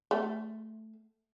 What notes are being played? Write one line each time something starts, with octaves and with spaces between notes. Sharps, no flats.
A3